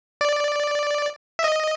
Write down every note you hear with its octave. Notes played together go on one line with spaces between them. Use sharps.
D5
E5
D#5